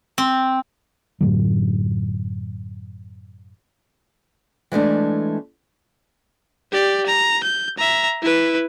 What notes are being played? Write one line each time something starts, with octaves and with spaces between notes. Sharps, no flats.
C4
F#2 A2 D3 F#3
E3 G#3 A3 D4
G4 D5
A#5
G6
E5 A#5
E4 B4